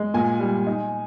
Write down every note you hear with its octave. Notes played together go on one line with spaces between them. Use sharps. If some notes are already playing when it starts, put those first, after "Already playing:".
Already playing: G#3
A#2 G#5
G3
D#4